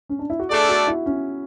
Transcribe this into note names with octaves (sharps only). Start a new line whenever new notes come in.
C#4
D4
E4
F#4
A3 D4 G#4 A4 D5
F#4
E4
C#4